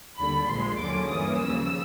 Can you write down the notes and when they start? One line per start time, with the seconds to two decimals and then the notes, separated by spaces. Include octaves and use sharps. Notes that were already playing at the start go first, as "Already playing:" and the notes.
0.19 D#2 D3 G3 B5
0.49 A#1 A#2 F3 G#3 C6
0.80 D#2 D3 F#3 A#3 C#4 D6
1.10 G2 E3 G3 A#3 C#4 D#6
1.41 D#2 C#3 F3 E6